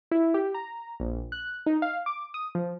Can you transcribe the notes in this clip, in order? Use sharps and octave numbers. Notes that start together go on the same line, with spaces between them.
E4
G4
A#5
A#1
F#6
D#4
F5
D6
D#6
F3